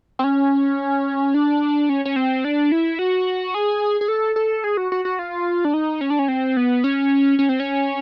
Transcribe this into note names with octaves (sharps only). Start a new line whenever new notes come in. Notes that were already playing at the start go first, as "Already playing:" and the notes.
C4
C#4
D4
C#4
C#4
C4
D4
E4
F#4
G#4
G#4
A4
A4
G#4
F#4
F#4
F#4
F4
D4
D#4
C#4
D4
C#4
C4
B3
C#4
C#4
C4
C#4